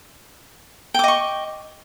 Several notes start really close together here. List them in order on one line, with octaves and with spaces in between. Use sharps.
G5 D6 D#5 C#6